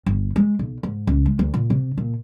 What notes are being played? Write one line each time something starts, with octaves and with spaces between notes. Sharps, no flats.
G1
G#3
B1
G#2
C#2
G#3
D2
A#2
C3
A#2